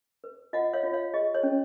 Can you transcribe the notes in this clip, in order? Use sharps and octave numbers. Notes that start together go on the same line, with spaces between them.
B4
F4 D#5 F#5
C#5 F5
F4
C#5 F5
G#4 D#5
C#5
C#4